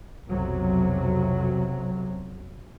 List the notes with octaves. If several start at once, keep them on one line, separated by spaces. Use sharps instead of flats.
B1 F2 C3 F#3